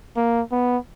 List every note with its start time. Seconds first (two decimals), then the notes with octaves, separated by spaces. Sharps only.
0.16 A#3
0.52 B3